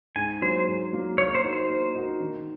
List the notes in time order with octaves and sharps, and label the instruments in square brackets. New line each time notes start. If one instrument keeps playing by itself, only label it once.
[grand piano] G#2 [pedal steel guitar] G#5
[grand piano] F#3 A#3 [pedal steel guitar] C5
[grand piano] G#2
F#3 A#3
[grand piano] A#3 [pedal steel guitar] C#5
[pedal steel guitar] C5
[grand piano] D#4 F#4 A#4
[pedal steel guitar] C5
[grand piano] A#3
D#4 F#4 A#4
D#3